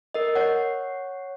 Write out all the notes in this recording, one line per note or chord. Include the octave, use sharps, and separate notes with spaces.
A#4 D#5
C#5 F#5